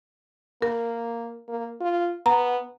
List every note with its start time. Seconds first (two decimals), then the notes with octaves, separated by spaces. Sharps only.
0.62 A#3 A#4
1.48 A#3
1.81 F4
2.26 B3 A#5